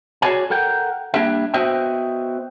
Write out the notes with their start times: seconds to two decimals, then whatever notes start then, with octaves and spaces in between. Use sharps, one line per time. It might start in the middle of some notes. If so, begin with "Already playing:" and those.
0.22 F#4 G#4 A4 C#5 D5 G#5
0.50 A4 A#4 F#5 G5
1.14 G3 A#3 D4 G4 A4 E5
1.54 B3 F#4 C5 D#5 E5 G5